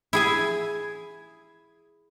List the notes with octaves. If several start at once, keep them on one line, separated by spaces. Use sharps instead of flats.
E4 G#4 G#5